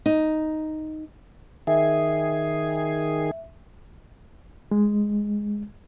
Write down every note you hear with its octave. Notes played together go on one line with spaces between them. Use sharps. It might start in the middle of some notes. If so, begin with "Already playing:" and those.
D#4
D#3 G#4 E5
G#3